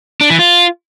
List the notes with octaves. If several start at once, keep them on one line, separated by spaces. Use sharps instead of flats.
D4
E3
F4